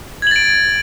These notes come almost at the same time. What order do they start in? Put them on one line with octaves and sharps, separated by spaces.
G#6 F#7 A6 D7